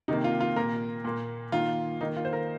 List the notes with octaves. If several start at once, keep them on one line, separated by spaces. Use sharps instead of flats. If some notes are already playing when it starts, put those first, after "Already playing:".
C3 D#3 A#3 D#4
F4
F4
A#2 A#3 A#4
A#2 A#3
D#3 A#3 F4
D#3 A#3 D#4
F4
C5
A#4